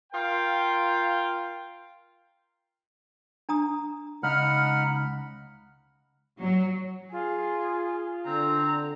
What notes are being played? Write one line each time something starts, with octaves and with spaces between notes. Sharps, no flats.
F4 A#4 F5 G5
D4 A#5 D#6
C#2 D#4 F#5 B5 F6
F#3
F4 G#4
D3 C4 A#5